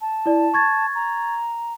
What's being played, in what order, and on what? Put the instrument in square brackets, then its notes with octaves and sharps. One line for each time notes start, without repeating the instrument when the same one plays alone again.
[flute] A5
[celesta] E4 D5
C#6 G#6 A6
[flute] A#5